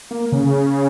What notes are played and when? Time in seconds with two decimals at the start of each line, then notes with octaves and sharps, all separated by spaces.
0.11 A#3
0.32 C#3